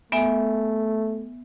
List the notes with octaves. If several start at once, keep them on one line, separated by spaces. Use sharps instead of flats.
A3 B3 E5 G#5